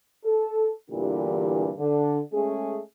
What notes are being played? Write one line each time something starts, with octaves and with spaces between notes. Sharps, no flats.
A4
E2 G2 A#2 D3 E3 G4
D3
G#3 A3 C#4 G#4